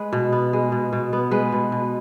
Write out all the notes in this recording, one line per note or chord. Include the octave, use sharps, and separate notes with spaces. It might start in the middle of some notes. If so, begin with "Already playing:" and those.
Already playing: G#3 B4
B2
B3
G#3
B2
B2
B3
G#3 B4
B2
B2